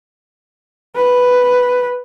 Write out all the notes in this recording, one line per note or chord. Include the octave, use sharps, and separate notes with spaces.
B4